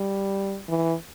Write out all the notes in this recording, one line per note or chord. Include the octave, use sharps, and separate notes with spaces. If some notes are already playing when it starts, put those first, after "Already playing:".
Already playing: G3
E3